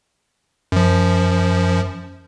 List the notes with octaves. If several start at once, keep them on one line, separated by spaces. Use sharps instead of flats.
F#2 F3